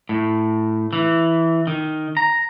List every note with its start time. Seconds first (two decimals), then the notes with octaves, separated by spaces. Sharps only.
0.09 A2
0.93 E3
1.67 D#3
2.17 A#5